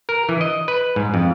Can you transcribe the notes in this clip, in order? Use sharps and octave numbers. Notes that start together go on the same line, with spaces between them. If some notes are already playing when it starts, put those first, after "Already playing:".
A#4
E3
D#5
B4
G#2
F2